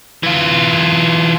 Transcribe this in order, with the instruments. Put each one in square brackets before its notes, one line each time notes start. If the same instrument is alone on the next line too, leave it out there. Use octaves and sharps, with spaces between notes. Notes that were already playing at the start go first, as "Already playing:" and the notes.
[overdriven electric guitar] E3 F4